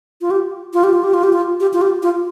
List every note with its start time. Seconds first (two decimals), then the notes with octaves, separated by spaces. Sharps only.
0.21 F4
0.31 G4
0.74 F4
0.84 G4
0.93 F4
1.04 G4
1.14 F4
1.23 G4
1.33 F4
1.60 G4
1.73 F4
1.82 G4
2.03 F4